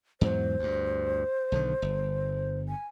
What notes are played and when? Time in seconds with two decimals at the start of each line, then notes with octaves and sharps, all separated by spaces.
0.21 E2 G#2 F#3 C5
0.59 D2 G2
1.52 B1 D3 D#3
1.82 G1
2.69 G#5